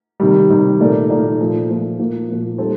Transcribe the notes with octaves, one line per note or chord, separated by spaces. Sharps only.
C3 D#3 G3
C3 D#3 G3
A#2 A3 D#4 A#4 D5
A#2 A3 D#4 A#4 D5
A#2 F3 A3
A#2 F3 A3
A#2 F3 A#3
A#2 F3 A#3
G3 C4 D#4 A4 C5